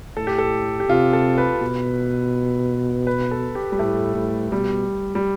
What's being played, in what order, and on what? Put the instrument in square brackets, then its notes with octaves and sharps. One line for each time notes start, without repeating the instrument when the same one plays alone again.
[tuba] A2 [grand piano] A4
[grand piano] G4
A4
G4
[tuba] C3 [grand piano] F4
[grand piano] A4
B4
[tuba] B2
[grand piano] B4
A4
G4
G3
[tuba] A2 [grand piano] A3
[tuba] A2
[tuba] B2 [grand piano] G3
[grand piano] G3